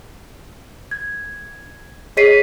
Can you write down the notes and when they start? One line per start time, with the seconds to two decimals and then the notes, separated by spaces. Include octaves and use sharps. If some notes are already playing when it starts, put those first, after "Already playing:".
0.91 G#6
2.17 G#4 C#5 D#5 B6 C7 D#7